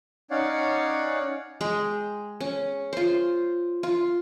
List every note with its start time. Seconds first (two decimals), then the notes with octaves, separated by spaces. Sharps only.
0.31 C#4 D#4 C#5 D5 F5 F#5
1.61 G#3 G#4 G5
2.40 C#4
2.93 F4 C5
3.83 F4